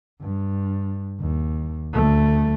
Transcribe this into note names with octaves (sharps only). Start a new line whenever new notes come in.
G2
D#2
D2 A3